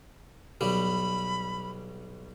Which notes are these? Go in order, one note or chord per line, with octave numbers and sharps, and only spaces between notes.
B1 G3 B5